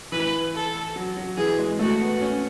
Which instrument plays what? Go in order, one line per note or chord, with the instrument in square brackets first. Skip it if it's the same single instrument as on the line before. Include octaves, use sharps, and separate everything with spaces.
[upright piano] E3 [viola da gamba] B4
[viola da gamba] A4
[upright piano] F#3
F#3
[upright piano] E3 [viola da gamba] G#4
[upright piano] G#3
[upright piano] A3 [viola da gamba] F#4
[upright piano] B3
C#4